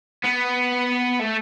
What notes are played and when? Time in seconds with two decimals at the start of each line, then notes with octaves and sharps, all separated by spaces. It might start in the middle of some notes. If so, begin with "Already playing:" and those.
0.24 B3
1.19 A3